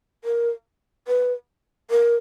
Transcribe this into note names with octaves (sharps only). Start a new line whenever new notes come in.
A#4
B4
A#4